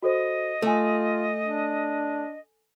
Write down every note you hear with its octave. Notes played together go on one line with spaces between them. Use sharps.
F#4 A4 C5 D#5
A3 F4 A4 G#5
D4